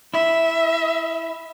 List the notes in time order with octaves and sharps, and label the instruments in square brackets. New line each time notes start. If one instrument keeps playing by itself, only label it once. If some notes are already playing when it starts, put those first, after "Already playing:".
[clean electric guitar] E4 [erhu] E5